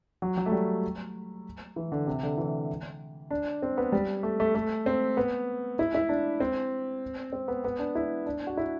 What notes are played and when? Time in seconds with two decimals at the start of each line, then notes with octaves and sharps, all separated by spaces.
0.22 F#3
0.37 F#3
0.46 A3
0.52 G3
1.76 E3
1.92 D3
2.07 C3
2.23 D3
2.38 E3
3.31 D4
3.62 C4
3.77 B3
3.92 G3
4.23 A3
4.40 A3
4.55 A3
4.86 C4
5.17 B3
5.79 E4
5.95 E4
6.09 D4
6.40 C4
7.33 C4
7.48 B3
7.64 B3
7.79 D4
7.95 E4
8.26 D4
8.47 F#4
8.57 E4